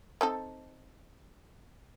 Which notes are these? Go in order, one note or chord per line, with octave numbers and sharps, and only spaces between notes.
C4 D#4 A4